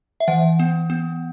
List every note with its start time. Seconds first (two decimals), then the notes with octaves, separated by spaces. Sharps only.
0.20 E5
0.28 E3 F#5
0.60 B3
0.90 B3